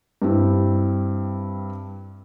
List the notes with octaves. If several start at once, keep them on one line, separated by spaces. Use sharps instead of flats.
G2 C4 E4